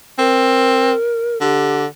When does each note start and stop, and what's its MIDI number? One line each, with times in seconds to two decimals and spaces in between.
0.19 0.92 60
0.19 1.40 70
1.41 1.86 50
1.41 1.83 67